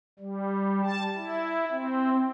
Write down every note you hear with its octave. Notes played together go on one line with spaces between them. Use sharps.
G3
A5
E4
C4